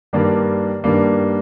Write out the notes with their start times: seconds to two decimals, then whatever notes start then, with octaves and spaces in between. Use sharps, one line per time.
0.13 G2 D#3 G3 A#3 D4
0.84 G2 D#3 G3 A#3 D4